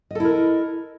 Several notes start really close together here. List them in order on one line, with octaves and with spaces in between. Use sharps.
D#5 A4 E4 A#4